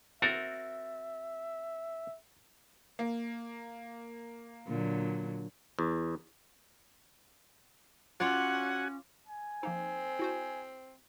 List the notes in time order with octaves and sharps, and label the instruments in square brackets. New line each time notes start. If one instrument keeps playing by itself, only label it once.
[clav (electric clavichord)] C4 F#4 A#4 [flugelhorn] E5 [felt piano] A6
[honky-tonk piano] A#3
[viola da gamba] A#2 D3 F#3
[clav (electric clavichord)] E2
[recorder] C#4 [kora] F4 C#5 D5 [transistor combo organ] F#4 G#5 [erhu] F#5
[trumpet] G#5
[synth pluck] F3 A#3 D#4 [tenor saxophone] C4
[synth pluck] E4 F#4 C5